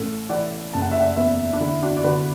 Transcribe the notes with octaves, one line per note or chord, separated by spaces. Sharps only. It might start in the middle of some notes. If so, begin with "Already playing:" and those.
Already playing: A1 A4
E3 D5 F#5
F#1 A5
F#5
E5
D5 F#5
E2 B4 E5
D4
D3 E4
D4 F#4
D5
D3 F#4 B4